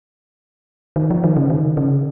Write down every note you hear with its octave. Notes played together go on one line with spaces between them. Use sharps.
D#3
F3
D#3
C#3
D#3
C#3